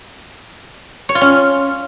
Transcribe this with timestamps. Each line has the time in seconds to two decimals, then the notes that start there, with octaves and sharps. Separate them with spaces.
1.09 C#5
1.15 F4
1.21 C#4